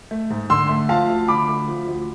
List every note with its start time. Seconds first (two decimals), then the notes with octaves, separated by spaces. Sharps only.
0.11 A3
0.30 G#2
0.50 D3 C6 E6
0.69 A3
0.89 F3 F5 A5
1.09 D2
1.28 D3 B5 D6
1.48 A3
1.68 F3
1.87 D2